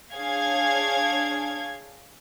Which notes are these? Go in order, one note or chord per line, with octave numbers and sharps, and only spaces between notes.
D4 G#4 C#5 F5 G#6